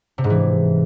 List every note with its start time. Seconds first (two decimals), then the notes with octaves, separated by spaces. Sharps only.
0.18 C3
0.24 G#2
0.30 E3